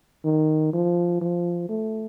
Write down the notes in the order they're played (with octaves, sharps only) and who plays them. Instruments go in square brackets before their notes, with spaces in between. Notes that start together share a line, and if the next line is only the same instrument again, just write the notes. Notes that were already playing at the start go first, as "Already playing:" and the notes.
[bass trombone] D#3
F3
F3
A3